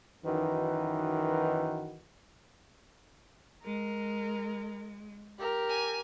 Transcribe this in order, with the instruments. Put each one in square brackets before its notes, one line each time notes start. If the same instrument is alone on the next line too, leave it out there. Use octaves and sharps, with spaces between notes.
[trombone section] F#2 D#3 E3 D#4 F#4 B4
[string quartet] G#3 [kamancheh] A#4
[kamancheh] G4 A#4
[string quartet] G#5